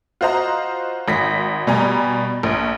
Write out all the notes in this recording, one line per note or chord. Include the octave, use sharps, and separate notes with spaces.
F4 F#4 C5 D#5 A#5
G#1 A#6 B6
B2 G3 G4 G#5 A#5
A#1